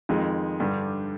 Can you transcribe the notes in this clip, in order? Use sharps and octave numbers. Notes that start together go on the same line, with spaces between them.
F2 D#3 G#3
G2 D3 G3